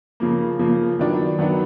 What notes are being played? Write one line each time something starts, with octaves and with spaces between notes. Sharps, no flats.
C#3 F3 A#3
C#3 F3 A#3
D#3 F#3 B3 D4
D#3 F#3 B3 D4